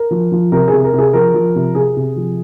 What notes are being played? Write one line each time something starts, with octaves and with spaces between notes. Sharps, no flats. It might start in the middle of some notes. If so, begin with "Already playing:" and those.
Already playing: A#4
F3
F3
C3 A#4
G#4
C3
A#4
C3 G#4
F3 A#4
F3
C3
C3 G#4
C3
F3